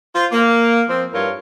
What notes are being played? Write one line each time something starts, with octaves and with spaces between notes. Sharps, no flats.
F4 C5
A#3
F3 C4
G2 E4 F4 A#4 C#5